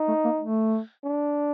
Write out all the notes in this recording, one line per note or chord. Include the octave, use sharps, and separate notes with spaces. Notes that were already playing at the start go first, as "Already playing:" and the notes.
Already playing: D#4
A3
A#3
A3
D4